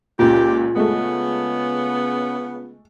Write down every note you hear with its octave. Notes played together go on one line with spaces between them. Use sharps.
C#2 A#2 F4 G4
C#3 G#3 A3 B3